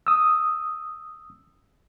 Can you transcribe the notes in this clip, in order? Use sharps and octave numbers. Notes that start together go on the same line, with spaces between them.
D#6 E6